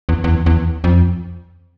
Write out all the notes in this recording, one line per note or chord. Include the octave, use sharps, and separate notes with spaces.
E2
E2
E2
F2